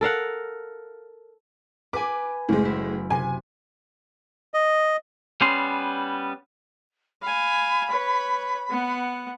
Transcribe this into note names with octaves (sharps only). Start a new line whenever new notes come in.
A4 A#4 F5 F#5
B4 G#5 D6
F#1 A2 G#3
E4
C3 G#5
D#5
G3 B3 C#4 C6
F5 G#5 B5
B4 C#5
B3 F#5